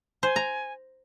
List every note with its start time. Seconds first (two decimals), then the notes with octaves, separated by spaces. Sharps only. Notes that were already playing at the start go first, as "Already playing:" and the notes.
0.23 C5 G#5
0.36 A#5